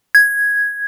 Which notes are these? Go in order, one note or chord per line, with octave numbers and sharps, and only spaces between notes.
G#6